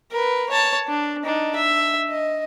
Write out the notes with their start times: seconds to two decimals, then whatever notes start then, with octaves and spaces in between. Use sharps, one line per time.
0.11 A#4 B4
0.50 C#5 A5
0.88 D4
1.24 D4 D#4
1.56 E5
2.10 D#5